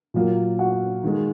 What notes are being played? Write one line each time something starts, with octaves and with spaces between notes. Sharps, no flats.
A#2 F#3 A#3
F#4 F#5
D#3 G#3